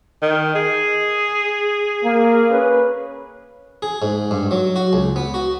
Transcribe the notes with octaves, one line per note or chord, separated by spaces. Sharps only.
D#3
G#4
A#3
C#4 B4
G#4
G#2
G2
F#3
F#4
C#2
B3
F#4